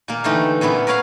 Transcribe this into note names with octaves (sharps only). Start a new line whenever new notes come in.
A#2 A#3
D3 E3 A3 D#4 G4
F#2 A#2 B3 E4
A#4 B4 C#5 F5 F#5